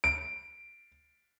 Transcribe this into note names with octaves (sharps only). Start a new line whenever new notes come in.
D7